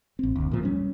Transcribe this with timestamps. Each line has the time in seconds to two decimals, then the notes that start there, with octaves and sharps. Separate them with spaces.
0.19 A1 C4
0.36 F#1 D2
0.51 A#2 F3
0.63 G3 C#4